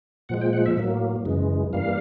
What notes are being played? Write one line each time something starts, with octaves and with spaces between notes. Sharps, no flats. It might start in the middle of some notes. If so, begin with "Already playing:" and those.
A#2 F3 G#3 F#5
G5
F#5
E5
A2 F#3 A#3
F#2 C#3 E3 G#3
G2 E3 G3 A#3 F5